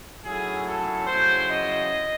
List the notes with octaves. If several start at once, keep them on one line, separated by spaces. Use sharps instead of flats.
D#3 F#3 A3 C#4 E4 G#4
A4
C#3 F#3 C#4 E4 C5
D#5